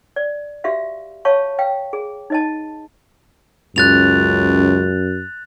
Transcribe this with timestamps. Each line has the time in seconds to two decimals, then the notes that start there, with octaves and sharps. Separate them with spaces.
0.16 D5
0.64 F#4 G4 E5 F5
1.25 C#5 F5 A5 C#6
1.59 F5 G5
1.93 G#4
2.30 D#4 D#5 A5
3.76 C#2 F#2 F#6 A6 F7